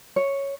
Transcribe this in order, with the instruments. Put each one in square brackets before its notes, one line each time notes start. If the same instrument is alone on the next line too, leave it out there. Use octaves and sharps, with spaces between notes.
[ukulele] C#5